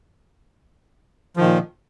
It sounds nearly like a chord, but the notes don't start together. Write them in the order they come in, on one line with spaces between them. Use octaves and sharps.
F3 D#3 A#2